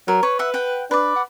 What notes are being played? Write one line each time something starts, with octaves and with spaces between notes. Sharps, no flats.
F#3 A#4
B4 C#5
E5 F#5
F#5 G5
D4 B4 D5
F#5